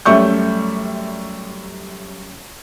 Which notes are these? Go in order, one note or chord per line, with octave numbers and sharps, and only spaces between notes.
F#2 G3 A3 E5 C#6 G6